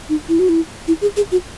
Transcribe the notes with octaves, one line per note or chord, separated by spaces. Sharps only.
D#4
E4
F#4
E4
E4
G#4
G#4
F#4